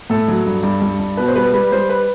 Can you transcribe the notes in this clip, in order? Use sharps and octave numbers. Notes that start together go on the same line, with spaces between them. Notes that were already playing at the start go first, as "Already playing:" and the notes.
A2 A4
F#3
G2
G2
G2
G2
B2 B4
C5
G3 B4
G3 B4
G3 C5
B4